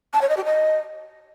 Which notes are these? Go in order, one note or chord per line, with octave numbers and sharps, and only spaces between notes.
A5
C#5
D#5
G4
D#5